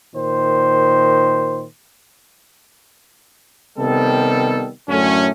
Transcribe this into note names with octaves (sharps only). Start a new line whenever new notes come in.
A#2 D#3 C5
C3 D#3 G3 B3 A4
F#2 A2 D3 A3 C#4